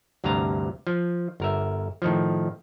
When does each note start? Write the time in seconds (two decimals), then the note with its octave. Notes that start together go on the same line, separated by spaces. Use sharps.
0.24 D2 G2 C3 F5 A#5
0.87 F3
1.40 G1 A#4 E5
2.02 A2 D#3 F3